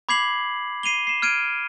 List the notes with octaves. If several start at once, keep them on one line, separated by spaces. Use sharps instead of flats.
B5 D6 G#6 B6 C7 F#7
C7 D#7 F7 G7
C7 E7
F6 G#6 D7 D#7